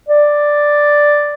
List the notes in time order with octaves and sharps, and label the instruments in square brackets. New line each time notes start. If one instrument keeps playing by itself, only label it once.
[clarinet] D5